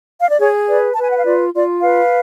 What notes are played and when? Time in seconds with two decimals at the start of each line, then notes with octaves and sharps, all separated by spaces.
0.20 F5
0.30 D5
0.40 G#4 C#5
0.68 B4 D5
0.94 A5
0.97 B4 G#5
1.10 F#5
1.17 F5
1.25 F4 D5
1.54 F4 D5
1.82 B4 F5